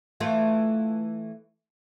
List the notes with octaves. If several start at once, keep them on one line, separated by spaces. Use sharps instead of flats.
E3 A3 F4